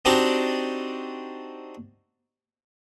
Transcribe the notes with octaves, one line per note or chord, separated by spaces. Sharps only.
C4 D4 D#4 F#4 G4 D5